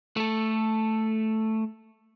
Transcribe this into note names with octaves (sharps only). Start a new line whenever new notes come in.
A3 A4